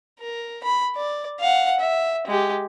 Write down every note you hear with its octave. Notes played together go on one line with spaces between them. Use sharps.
A#4
B5
D5
F5 F#5
E5
G#3 G4